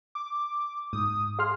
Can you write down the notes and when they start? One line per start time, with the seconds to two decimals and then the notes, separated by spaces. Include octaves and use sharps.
0.15 D6
0.93 G#2 D#6
1.39 G#4 F5 C6 F6